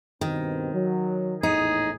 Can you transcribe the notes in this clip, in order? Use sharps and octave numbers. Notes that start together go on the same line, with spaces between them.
G2 B2 D#3 C4
F#3
A#1 E2 A2 D#4 G#4